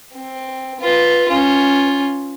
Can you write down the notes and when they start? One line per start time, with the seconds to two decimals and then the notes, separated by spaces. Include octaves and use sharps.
0.14 C4
0.81 F4 B4
1.28 C#4 F4